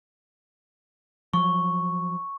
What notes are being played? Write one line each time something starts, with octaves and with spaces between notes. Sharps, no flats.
F3 F#3 C#6